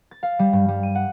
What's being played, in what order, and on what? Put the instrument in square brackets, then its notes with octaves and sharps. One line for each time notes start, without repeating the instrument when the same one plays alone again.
[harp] A6
F5
G3
G2
G3
D#7
F#5